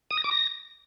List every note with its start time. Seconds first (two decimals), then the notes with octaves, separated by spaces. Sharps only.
0.11 D#6
0.17 A#6
0.24 D6
0.31 A#6